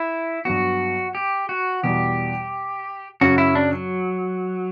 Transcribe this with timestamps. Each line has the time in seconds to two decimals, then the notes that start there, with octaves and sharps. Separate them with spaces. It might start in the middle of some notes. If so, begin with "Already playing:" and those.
Already playing: E4
0.45 G2 F#3 B3 F#4
1.15 G4
1.49 F#4
1.83 E2 B2 G3 G4
3.21 F#2 C#3 F#3 C#4 F#4
3.38 E4
3.55 D4
3.73 F#3